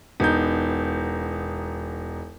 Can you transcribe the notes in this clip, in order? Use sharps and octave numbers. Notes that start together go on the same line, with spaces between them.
E1 B3 D#4 G6